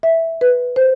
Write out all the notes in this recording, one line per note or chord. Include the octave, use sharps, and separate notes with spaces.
E5
B4
C5